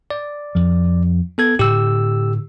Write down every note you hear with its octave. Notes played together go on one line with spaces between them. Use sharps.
D5
F2 F3
B3 A4 G#6
A2 D3 G4 E6